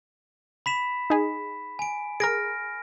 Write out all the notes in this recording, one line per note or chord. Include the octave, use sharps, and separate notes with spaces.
B5 B6 E7
D#4 G#4
G#5 D7
G#4 A#4 F6 A#6 D7